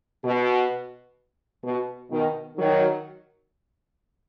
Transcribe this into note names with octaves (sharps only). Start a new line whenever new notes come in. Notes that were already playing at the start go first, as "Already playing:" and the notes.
B2
B2
B2 D#3
D#3 F#3